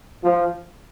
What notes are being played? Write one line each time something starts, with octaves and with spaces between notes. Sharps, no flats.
F3